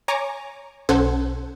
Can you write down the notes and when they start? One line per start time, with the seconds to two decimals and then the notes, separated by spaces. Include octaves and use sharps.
0.08 C#5 G#5 A#5 C#6 D6
0.89 B1 C#4 A4 C5 F#5 G#6